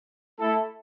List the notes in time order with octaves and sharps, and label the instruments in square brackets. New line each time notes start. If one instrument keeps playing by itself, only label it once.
[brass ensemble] A3 E4 A4